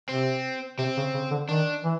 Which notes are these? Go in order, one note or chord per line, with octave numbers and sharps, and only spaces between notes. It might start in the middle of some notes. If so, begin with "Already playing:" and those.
C3 C4
C3 C4
C#3
C#3
D3
D#3 D4
E3